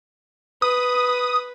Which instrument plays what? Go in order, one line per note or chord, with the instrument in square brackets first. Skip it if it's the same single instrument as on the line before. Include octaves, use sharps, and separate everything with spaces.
[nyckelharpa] B4 [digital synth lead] D#6